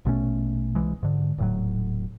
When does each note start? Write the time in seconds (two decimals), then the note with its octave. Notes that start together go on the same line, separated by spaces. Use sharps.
0.05 A#1 B2 A3 C#4
0.75 C2 E3 G#3
1.03 G#2 D3
1.38 D#1 A2 F#3